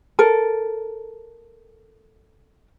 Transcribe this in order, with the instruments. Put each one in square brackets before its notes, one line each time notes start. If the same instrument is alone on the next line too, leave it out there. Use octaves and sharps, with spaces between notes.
[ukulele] A4 A#4